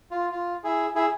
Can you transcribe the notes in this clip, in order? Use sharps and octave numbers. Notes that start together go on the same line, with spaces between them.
F4
F4
E4 G#4
E4 G#4